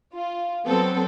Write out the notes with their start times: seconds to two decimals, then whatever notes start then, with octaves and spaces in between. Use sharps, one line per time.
0.13 F4
0.65 F#3 B3 C4 A4